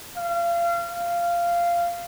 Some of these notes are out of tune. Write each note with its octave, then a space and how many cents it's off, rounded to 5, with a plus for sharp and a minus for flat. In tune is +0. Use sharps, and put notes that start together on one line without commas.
F5 -30
F5 -15